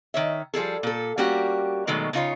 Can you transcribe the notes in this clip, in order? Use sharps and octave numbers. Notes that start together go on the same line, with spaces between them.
D#3 C#5 E5
F3 G3 G#4 A4
A#2 A4
G3 A#3 C#4 F#4 G4
B2 D#3 F#3 G#3 A3
C#3 D#4 F4 C#5